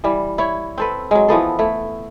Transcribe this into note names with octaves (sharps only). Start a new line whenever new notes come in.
E3 G3
E4 C#5
C4 A4 B4
F#3 G#3
E3 F3 B3 A4
A3 E4